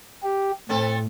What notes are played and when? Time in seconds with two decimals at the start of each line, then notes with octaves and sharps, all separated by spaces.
0.23 G4
0.69 A2 B3 C4 A4